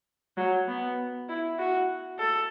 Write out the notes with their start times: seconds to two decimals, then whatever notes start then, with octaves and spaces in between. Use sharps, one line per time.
0.37 F#3
0.68 B3
1.29 E4
1.59 F#4
2.19 A4